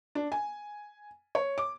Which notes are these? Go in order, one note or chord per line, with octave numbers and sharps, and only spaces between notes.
D4
G#5
C#5
D6